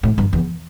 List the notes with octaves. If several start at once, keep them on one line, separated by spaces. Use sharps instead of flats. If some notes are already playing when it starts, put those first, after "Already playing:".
A2
G2
E2